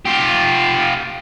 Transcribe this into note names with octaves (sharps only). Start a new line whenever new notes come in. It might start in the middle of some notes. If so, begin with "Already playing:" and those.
F4 G4